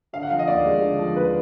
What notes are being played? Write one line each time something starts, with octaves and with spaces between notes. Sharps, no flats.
D3 F5
F#5
F3 F5
D#5
D#2 D5
G#3
D3
F3
D#2 B4